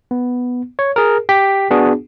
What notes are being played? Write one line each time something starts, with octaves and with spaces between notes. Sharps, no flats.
B3
C#5
G#4 A#4
G4 G5 B6
B3 D4 F#4 G#4